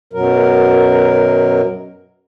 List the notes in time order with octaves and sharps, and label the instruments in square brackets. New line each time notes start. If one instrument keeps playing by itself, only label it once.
[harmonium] F#2 B2 F#3 A#4